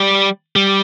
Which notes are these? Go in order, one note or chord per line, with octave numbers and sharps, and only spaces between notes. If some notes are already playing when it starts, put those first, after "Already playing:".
Already playing: G3
G3